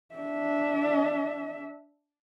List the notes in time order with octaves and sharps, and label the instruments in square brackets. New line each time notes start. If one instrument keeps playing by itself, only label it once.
[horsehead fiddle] D4 E5